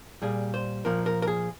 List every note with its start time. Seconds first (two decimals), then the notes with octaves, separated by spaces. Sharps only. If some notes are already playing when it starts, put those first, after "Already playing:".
0.22 A#2 G3 G#4
0.54 C5
0.85 A#2 F3 A#4
1.06 A#4
1.22 A#4
1.27 G#4